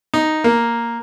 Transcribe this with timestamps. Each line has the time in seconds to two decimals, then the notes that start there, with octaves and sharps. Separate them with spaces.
0.14 D#4
0.44 A#3